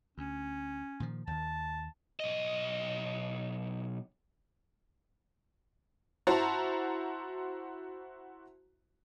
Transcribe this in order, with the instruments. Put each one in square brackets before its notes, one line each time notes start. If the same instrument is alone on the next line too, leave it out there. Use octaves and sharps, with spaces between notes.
[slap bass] D2 [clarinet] C#4
[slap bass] A#2 D#3 F3
[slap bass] D#2 D#3 [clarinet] A5
[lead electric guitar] B1 D#5
[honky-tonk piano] E4 F#4 C5 A5 A#5